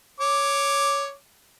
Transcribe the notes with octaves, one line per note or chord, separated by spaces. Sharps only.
C#5 D6